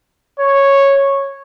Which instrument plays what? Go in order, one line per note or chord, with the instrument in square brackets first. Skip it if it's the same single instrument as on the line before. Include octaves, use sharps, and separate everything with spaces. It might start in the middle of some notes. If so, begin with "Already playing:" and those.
[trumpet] C#5